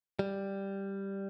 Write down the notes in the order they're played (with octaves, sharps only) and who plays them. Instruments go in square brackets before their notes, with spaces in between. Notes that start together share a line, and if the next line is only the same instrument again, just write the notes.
[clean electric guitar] G3